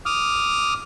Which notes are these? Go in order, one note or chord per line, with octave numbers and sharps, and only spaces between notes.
D6 D#6 F6